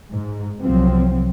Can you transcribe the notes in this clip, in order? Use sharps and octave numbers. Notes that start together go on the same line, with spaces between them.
G#2
C2 F3 F#3 C4